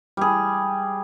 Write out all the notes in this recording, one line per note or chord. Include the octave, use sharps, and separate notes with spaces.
G3 G#4